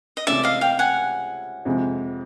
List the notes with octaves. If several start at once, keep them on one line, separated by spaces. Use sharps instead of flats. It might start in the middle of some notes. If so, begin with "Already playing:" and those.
D#5
C#2 C3 E3 A3 C#4 D5 E5
D#5 F5
F5 G5
F#5 G#5
F2 C3 F3 G#3